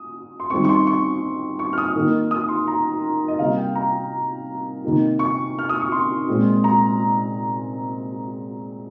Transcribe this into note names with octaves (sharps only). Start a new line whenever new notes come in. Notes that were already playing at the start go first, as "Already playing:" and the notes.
Already playing: D#6
C6
D#3 G3 C4 C#6
C#6
C6
C#6
C#6
F6
D#6
D#3 A#3 D#4
D#6
C6
A#5
D#5
C3 G3 A#3 F5
G5
A#5
C3 D#3 A#3 D#4
C#6
F6
D#6
C#6
C6
A#2 G#3 C4
A#5